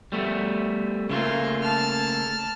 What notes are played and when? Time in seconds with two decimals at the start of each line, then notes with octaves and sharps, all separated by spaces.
0.12 G3 A3 B3
1.10 C#3 A3 A#3 F4
1.63 A5 F6